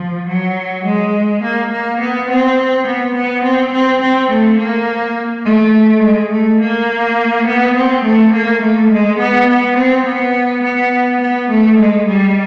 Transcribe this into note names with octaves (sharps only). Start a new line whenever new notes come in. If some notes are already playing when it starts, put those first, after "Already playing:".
Already playing: F3
F#3
G#3
A#3
A#3
B3
C4
B3
B3
C4
C4
C4
A3
A#3
A3
G#3
A3
A#3
B3
C4
A3
A#3
A3
G#3
B3
B3
C4
B3
B3
B3
A3
G#3
G3